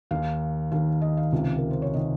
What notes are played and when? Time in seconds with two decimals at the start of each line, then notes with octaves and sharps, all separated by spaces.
0.11 D#2 D#3 F5
0.72 D#2 D#3 F5
1.01 D#5
1.17 F5
1.32 C#2 C3 D#3
1.38 F5
1.58 A#4
1.71 C5
1.82 C#5
1.94 C3 D#3 D#5